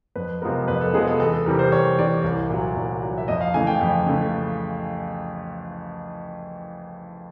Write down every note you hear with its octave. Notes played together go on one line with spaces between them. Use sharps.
F2 B4
C3 F3 G#3 B3 A#4
F2 B4
A4
C3 F3 G#3 B3 G#4
A4
E2 A4
A4
C3 E3 G3 A#4
C5
E2 C#5
C3 E3 G3 D5
C2
A#2 F#3
C2
A#2 F#3
E5
F2 D#5
F5
C#3 E3 A3 G#5
G5
F2
C#3 E3 A3